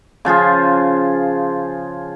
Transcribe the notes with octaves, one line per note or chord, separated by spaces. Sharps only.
C#3 F3 F4 G#4